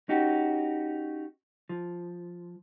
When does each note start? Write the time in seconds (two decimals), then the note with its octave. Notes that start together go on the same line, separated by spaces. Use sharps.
0.09 C#4 D#4 F#4 G4
1.69 F3